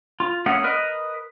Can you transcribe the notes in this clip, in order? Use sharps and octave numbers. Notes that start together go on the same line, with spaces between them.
F4
A3 A#3 C#4 G#4 F#5
A#4 B4 D#5